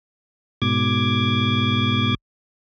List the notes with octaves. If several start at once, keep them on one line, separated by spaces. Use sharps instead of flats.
G#2 B2 D6 G#6